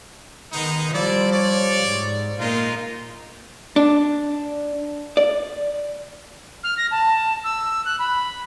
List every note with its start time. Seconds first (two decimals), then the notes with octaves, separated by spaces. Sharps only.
0.52 D#3 G#3 B3 D#4
0.93 F3 G3 E4 D5
1.32 C#5 D5
1.84 G#2
2.39 A#2 G#3 A#3 D#4 F4
3.76 D4
5.17 D5
6.63 F6
6.77 A#6
6.91 A5
7.44 E6
7.85 F#6
7.99 B5